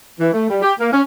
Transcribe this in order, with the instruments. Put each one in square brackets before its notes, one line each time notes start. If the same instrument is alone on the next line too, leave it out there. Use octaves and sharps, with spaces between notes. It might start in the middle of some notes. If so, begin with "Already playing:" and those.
[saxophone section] E3
A3
G3
G4
A#3
C#4